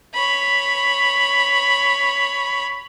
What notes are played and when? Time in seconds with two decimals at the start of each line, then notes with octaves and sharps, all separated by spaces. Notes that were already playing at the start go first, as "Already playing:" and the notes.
0.14 C#5 B5